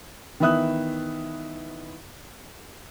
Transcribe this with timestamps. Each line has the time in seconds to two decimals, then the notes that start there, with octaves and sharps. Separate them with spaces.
0.40 D#3 E3 B3 E5 D#6 F#6